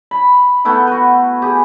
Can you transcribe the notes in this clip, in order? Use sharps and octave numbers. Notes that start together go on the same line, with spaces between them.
B5
A3 B3 E4 G5
F#4 B4
G4 G#4